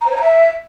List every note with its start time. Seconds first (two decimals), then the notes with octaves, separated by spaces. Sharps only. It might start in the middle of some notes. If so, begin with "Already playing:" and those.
0.01 A#5
0.06 C5
0.11 C#5
0.16 A#5
0.21 E5